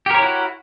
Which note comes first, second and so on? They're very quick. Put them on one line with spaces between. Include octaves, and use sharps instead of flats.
G4 A#4 C#5 E4 F#4